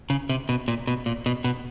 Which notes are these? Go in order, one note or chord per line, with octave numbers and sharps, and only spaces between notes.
C#3
C3
B2
A#2
B2
A#2
B2
B2